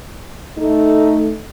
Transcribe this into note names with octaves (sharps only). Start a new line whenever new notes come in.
A3 D#4